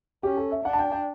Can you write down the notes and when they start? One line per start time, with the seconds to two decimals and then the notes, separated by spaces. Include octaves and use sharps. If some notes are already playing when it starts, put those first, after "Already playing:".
0.23 C#4 G4
0.37 A4
0.51 E5
0.65 D4 F#5
0.73 A5
0.79 G5
0.92 G5